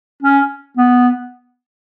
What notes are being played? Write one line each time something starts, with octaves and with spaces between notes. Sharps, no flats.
C#4
B3